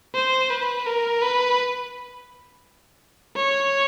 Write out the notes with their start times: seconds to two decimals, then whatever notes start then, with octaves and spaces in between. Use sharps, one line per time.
0.15 C5
0.50 B4
0.87 A#4
1.22 B4
3.35 C#5